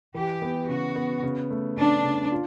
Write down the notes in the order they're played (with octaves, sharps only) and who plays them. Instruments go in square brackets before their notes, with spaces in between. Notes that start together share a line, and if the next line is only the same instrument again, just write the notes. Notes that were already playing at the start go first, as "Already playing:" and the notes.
[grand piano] E3 [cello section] G4
[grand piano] B3
[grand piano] C#3 [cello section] F#4
[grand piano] B3
C#3
A3
[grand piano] C#3 [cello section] D4
[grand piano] C#3
F4